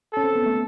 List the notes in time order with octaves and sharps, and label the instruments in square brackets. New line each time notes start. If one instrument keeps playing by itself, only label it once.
[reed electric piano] C#4 [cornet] A4
[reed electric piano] C4
B3
A3